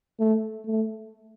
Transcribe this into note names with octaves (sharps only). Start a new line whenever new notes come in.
A3
A3